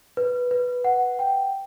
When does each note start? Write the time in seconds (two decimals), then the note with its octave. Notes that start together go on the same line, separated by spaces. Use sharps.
0.17 B4
0.51 B4
0.84 F#5
1.19 G5